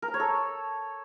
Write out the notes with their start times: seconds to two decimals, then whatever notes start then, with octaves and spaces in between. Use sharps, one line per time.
0.02 A#4
0.08 A#5
0.14 C#5
0.20 A4